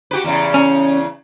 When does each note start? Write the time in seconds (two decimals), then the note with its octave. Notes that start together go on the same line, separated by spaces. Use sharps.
0.11 F#4 G4 B4
0.24 E2 C#3
0.54 C#4